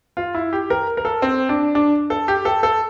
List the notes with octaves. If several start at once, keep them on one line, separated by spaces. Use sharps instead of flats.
F4
E4
G4
A#4
A#4
A4
C4
D4
D4
A4
G4
A4
A4